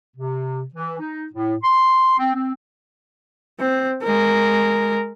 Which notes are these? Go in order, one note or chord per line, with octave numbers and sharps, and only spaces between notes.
C3
E3
D#4
A2
C6
C4
C4
C4
G#3 A#4